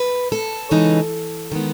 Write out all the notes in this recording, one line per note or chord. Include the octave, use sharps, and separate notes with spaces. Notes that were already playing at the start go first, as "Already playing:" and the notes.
Already playing: B4
A4
C#3 E3 G#3 D#4
D#3 G#3 B3